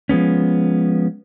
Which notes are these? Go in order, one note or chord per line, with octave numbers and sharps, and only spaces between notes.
F3 G#3 B3 C#4